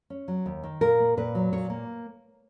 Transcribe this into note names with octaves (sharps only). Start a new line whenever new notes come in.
C#4
F#3
D#2
D#3
A#2 A#4
A#3
A#2 B4
F#3
A#2 C#5
A#3